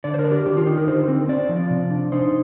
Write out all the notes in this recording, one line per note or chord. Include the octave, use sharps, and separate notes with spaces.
D3 D5
C5
A#4
D4
G4
D#3 G4
F4
D#4 G4
A#4
D3 C5
C4
C4 D5
F3
C3
D4
D#4 C5